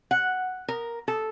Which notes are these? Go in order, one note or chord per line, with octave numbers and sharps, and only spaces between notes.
F#5
A#4
A4